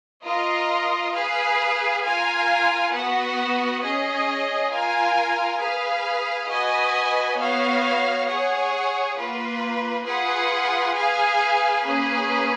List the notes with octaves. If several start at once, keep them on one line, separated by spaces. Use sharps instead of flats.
F4 A#4 D#5
G#4 B4 F5
F4 A#4 F5 G#5
B3 F#4 B4 F#5
C#4 G#4 D#5
F4 A#4 F5 G#5
G#4 B4 F5
F#4 B4 D#5 G#5
B3 F#4 C#5 F5
G#4 C#5 F#5
A#3 F4 B4
F4 G#4 B4 F#5
G#4 B4 F5 G#5
A#3 C#4 G#4 B4